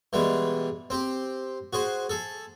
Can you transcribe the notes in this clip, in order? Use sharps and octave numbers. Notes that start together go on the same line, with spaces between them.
B2 E3 G3 G#3
C4 G4
F#4 G#4 C5
G#4 A4